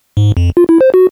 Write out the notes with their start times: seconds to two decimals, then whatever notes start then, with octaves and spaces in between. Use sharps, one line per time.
0.17 G#2
0.37 F2
0.57 F4
0.69 E4
0.81 C5
0.94 F#4